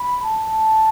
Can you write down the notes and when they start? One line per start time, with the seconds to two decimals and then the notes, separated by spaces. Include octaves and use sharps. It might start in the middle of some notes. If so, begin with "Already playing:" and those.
Already playing: B5
0.23 A5